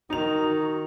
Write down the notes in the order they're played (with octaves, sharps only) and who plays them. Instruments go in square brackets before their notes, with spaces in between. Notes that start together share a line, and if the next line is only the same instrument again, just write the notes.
[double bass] D#3 [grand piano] D#4 F7 [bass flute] F#4